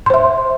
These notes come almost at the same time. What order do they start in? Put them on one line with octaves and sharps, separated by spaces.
C6 C5 E5